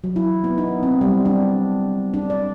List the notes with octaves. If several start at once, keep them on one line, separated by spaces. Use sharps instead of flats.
F#3
E4
B3
D#4
C4
G3
D4
D4
D5